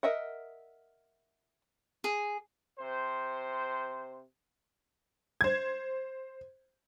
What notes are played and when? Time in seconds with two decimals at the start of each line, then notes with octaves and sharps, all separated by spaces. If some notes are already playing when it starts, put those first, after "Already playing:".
0.03 A#4 D#5 E5 F#5
2.04 G#4
2.78 C3 C5
5.41 C5 G#6